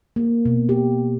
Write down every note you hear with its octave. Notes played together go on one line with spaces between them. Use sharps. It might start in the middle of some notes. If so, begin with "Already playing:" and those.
A#3
B2
G4